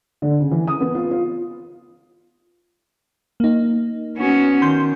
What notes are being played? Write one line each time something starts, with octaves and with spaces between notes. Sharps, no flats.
D3
C#3
E3
D#6
B3
F4
F4
A#3 D#4
B3 C#4 F#4
D#3 C6 G6